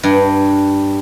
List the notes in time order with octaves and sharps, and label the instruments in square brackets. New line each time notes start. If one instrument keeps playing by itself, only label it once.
[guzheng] G2